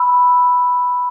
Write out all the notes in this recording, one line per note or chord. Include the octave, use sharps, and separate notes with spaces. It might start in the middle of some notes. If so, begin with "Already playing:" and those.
Already playing: B5 E6